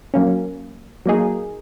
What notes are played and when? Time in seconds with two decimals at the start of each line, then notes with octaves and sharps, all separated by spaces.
0.14 F#3 A#3 C#4
1.06 F#3 A#3 D#4 G#4